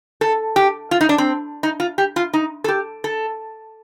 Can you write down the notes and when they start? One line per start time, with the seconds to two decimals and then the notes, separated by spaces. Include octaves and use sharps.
0.21 A4
0.56 G4
0.91 F4
1.01 D#4
1.09 D4
1.18 C4
1.63 D#4
1.80 F4
1.98 G4
2.16 F4
2.33 D#4
2.64 A4
2.68 G4
3.04 A4